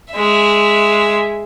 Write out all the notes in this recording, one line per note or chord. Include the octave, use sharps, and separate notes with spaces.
G#3 E5